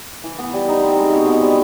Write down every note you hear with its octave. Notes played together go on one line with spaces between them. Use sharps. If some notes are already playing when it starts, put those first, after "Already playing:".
E3
B3
G3
D#4
C4
G#3
B2
B3
G3